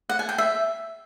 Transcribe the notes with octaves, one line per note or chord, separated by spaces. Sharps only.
F#5
G#5
G5
E5